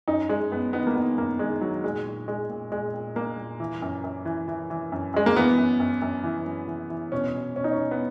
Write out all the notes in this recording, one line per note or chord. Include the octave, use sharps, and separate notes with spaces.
F#2 D#4
F#2 G#3
F#2 B3
D#3 B3
A#3
D#3 B3
F#2 A#3
D#3 G#3
D#3 F#3
A#2 G#3
A#2
A#2 G#3
A#2
A#2 G#3
A#2
A#2 A#3
A#2
E3
F#2
F#2
E3
E3
E3
F#2
F#2 G#3
A#3
E3 B3
F#2
F#2
F#2
E3
F#2
E3
E3
B2 C#4
B2
B2 C#4
D#4
C#4
B2
B3